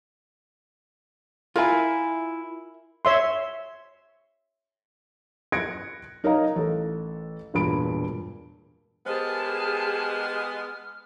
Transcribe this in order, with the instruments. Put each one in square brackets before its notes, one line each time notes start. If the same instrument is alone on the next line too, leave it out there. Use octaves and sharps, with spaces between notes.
[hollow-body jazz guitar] E4 F4 [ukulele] A#4 E5 G#5
[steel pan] C#5 E5 C6
[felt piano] F#6 G#6 A#6 C#7 D7
D#4 A#4 C#5 D#5 F5 A#5
A1 A4
E1 G2 A#2 B5 D7
[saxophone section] G#3 B3 [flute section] G4 G#4 A5 [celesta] A#4 C5 [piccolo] F6